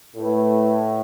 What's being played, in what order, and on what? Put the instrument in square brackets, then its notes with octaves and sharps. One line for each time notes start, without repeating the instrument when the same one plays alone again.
[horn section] A2 [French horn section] A3 E4 B4